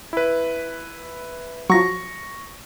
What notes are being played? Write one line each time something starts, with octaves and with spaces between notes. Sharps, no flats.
E4 B4
F3 F#3 C#6 A#6